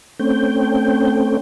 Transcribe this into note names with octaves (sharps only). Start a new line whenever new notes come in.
A3 C4 C#4 G5